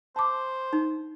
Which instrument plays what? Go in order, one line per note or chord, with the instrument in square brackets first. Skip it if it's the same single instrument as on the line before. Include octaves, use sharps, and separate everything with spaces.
[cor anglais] C5 [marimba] A5 D6
[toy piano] D#4